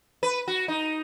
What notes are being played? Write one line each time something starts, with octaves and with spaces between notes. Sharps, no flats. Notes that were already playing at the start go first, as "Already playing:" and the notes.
B4
F#4
D#4